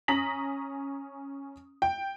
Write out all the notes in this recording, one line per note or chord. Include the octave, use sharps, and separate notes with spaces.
C#4 A#5 D#6 A#6 B6 F#7
G5